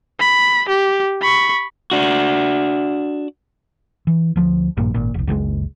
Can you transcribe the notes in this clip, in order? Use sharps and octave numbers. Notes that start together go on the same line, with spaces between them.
B5
G4
B5 C#6
D4 F#4
E3
D2 F3
A#1 G2 A#2
G#1 A#2
F1 C2
F#1 C#2 A#2 G#3